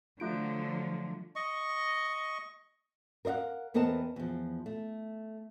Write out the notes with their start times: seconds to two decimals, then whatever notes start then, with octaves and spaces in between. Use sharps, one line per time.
0.20 D3 F3 F#3 A3 F4 D7
1.36 D#5 C#6
3.25 A#4 C5 D#5 F5 F#5
3.74 E2 B3 C4 A#4 D#5 A5
4.16 E2 F3
4.66 A3